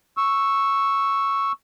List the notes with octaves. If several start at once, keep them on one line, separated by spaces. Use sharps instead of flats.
C#6 E6